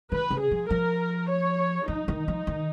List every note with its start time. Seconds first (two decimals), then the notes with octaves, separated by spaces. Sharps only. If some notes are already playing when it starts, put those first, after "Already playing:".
0.12 D#3 B4
0.30 C#3
0.40 G#4
0.51 F3
0.70 F3 A#4
1.30 C#5
1.88 F3 D#4
2.08 D#3
2.28 F3
2.47 D#3